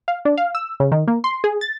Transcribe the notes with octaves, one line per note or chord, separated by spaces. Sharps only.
F5
D4
F5
E6
C#3
D#3
A#3
C6
G#4
A6